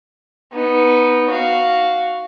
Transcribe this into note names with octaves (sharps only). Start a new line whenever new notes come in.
B3 D#4
F#4 F5